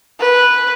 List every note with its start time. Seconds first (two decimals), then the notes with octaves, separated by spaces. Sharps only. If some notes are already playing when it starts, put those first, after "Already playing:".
0.20 B4